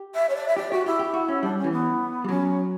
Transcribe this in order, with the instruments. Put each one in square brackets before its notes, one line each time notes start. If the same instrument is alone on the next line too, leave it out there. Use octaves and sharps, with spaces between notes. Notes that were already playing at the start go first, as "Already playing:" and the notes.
Already playing: [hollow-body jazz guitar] G4
[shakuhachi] E5
C#5
D5
E5
[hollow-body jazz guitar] G4 [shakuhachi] D5
[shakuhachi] F#4 [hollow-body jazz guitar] G4
[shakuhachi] E4 [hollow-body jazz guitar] G4
[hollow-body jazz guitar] G4
F#4
C#4
[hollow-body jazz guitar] G3 [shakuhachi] D4
[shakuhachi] C#4
[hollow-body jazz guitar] E3
[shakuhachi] B3
[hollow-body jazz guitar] G3
[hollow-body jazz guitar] F#3 [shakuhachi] C#4